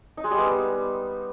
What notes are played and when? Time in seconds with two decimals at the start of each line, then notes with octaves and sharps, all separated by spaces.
0.17 D#4
0.24 G#3
0.31 G3
0.37 B3